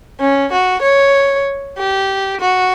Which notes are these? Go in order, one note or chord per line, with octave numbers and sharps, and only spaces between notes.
C#4
F#4
C#5
G4
F#4